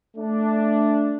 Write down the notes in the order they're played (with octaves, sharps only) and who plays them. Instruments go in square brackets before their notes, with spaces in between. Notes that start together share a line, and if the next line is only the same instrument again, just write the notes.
[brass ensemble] A3 D4